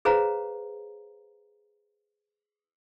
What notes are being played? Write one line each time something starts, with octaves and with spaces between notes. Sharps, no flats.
G#4 B4 C5 F5 A#5